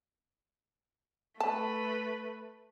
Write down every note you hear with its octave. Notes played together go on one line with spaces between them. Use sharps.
A3 B4 A5